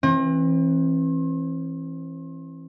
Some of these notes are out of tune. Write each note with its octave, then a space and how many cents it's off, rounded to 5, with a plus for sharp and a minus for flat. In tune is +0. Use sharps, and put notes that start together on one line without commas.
E3 +0 C4 +40